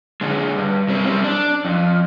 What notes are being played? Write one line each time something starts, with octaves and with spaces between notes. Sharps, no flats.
D3 G#3
G2
G3 C4
G3 C4
D4
F2